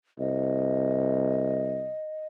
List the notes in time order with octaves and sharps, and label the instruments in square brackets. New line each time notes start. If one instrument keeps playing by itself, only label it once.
[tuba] C2 [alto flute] D#5